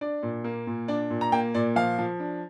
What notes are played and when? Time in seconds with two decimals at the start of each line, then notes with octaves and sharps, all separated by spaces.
0.01 D4 D5
0.23 A#2
0.44 A#3
0.67 A#2
0.88 D4 D5
1.10 A#2
1.21 A#5
1.32 A#3 G5
1.54 A#2 D5
1.76 F3 F5
1.98 F3
2.20 D4